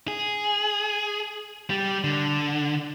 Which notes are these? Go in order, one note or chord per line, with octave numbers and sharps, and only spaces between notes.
G#4
G3
D3